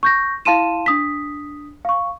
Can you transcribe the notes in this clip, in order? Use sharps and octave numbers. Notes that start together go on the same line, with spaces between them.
C#6 G6 A#6
E4 F5 A5 C6 D#7 E7
D4 D#6 B6
F5 C#6